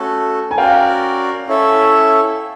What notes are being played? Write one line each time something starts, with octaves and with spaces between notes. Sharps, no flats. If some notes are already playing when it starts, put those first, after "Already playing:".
Already playing: A3 C#4 F#4 A4
G#5
C#4 F#4 A#4 D5 F5 G5
C#4 E4 A4 C#5 E5